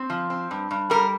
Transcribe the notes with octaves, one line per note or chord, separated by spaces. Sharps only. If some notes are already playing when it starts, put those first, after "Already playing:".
Already playing: C4
F3
C4
G2
G2
G3 A#4